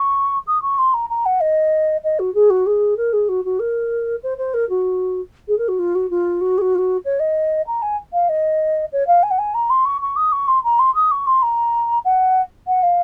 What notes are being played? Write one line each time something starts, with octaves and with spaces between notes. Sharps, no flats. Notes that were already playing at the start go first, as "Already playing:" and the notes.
Already playing: C#6
D#6
C#6
C6
A#5
A#5
F#5
D#5
D#5
F#4
G#4
F#4
G#4
A#4
G#4
F#4
F#4
A#4
C5
C5
A#4
F#4
G#4
A#4
F#4
F4
F#4
F4
F#4
G#4
F#4
F4
F#4
C#5
D#5
A#5
G#5
F5
D#5
C#5
F5
G#5
F#5
G#5
A#5
C6
C#6
C#6
D#6
C#6
C6
A#5
C6
D#6
C#6
C6
A#5
F#5
F#5
F5